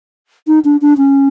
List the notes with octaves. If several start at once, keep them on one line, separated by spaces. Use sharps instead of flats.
D#4
D4
D4
C#4